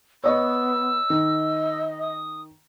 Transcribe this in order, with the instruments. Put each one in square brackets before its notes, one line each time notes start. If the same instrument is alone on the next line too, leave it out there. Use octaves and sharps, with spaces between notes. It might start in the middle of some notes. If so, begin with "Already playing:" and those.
[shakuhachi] B3 [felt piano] C#5 D#5 C#6 [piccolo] E6
[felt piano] D#3 [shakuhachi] D#5
[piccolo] D#6